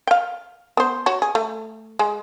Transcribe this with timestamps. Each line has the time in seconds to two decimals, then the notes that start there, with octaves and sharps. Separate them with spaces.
0.07 F5 G5
0.77 B3 C5
1.06 F#4 C#5
1.22 G#4
1.35 A3
1.99 G#3